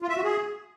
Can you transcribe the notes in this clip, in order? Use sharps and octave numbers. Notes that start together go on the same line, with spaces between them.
F4
E5
F#4
G#4